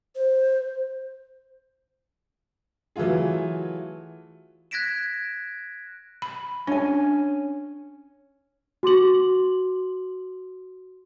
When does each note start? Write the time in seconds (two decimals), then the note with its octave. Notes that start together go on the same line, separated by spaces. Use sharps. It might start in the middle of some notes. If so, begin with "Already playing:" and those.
0.15 C5
2.96 E3 F#3 A3 F4 G#4
4.71 F#6 G#6 A#6 B6 D7 E7
6.22 B5
6.67 C#4 D4 G#5
8.83 F#4 C6 D6 F#7